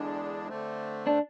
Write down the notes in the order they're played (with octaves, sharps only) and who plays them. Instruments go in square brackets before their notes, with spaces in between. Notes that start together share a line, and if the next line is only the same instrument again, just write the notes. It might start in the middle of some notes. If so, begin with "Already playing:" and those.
Already playing: [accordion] E2 D3 G#3 D4
D3 A3 C4
[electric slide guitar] D4